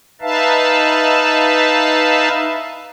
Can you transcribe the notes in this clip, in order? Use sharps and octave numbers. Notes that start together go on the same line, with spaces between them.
D#4 B4 E5 F5 A5